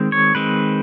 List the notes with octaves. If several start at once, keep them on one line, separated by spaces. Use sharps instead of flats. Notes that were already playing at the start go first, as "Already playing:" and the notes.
Already playing: D#3 G#3 C4
C#5
D#3 G#3 C4 B4